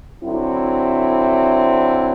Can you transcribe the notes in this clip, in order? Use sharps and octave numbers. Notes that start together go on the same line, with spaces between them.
D3 F#3 C4 E4